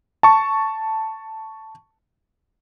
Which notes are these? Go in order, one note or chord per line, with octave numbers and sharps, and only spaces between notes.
A5 C#6